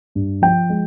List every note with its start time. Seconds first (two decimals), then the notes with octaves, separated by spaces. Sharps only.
0.15 G2
0.42 F3 G5
0.69 G#3